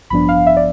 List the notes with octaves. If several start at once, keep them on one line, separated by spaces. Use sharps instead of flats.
A1 G2 F3 B3 D4 B5
F5
E5
D5